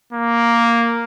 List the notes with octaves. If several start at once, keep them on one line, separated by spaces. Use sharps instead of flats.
A#3